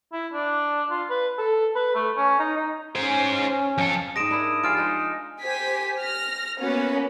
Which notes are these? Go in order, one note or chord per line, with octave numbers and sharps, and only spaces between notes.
E4
D4
F4
B4
A4
B4
A3
C#4
D#4
D#4
C#4 G#4 C5
F2 A4
G#2 G#3 D#6 A#6 D7 E7
D4 E4 A#4
F3 F4 G4 G#5 F6 D7
G#3 D#4 G#4
G4 C5 G#5 B6
F6 A#6
A#3 B3 C#4 F#4 B4